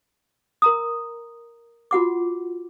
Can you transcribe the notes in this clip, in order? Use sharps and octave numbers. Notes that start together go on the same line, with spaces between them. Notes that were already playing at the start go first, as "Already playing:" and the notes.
A#4 A#5 D#6
F4 F#4 F#5 D6